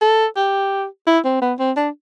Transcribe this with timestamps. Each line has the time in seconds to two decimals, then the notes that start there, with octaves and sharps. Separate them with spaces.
0.01 A4
0.36 G4
1.07 E4
1.25 C4
1.42 B3
1.59 C4
1.77 D4